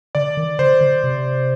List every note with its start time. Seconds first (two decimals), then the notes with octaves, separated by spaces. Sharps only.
0.15 D3 D5
0.37 D#3
0.59 D3 C5
0.81 D3
1.04 C3